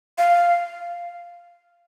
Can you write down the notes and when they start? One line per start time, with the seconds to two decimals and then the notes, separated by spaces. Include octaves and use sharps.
0.18 F5